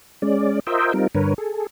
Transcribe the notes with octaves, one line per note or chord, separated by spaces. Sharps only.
G#3 C#4 D5
F4 A#4 C5 D#5 E5 G5
G3 C4 D#4 F4 A#4
G2 D3 A#4 B4 C#5
G#4 A4